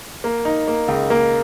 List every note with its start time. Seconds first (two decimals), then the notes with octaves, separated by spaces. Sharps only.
0.24 A#3
0.45 D#4
0.68 A#3
0.88 C#2
1.10 A#3